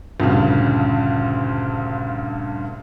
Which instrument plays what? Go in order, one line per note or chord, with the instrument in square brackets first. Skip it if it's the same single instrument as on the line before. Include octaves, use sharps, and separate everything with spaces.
[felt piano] D2 G2 A#2 C#3